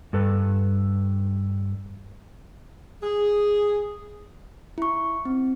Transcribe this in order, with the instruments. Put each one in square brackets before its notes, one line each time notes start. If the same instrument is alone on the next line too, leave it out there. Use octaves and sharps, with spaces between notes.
[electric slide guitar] G2 A4 B4
[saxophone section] G#4
[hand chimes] E4 C#6
C4